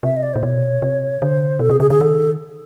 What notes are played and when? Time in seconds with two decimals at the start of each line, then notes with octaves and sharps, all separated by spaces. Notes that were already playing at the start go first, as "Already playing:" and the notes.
0.03 C3 E5
0.16 D#5
0.23 D5
0.34 A#2 C5
0.43 B2 C#5
0.82 C3
1.22 D3 C5
1.59 B2 A4
1.70 C3 G#4
1.80 C#3 G#4
1.90 D3 G#4
2.00 D#3 A4